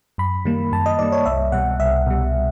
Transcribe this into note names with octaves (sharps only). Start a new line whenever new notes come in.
F#2 B5
D#3 G3 A#3
F#2 A5
D#5
D#3 G3 A#3 D5
C#5
C2 E5
B2 G3 F#5
C2 E5
B2 G3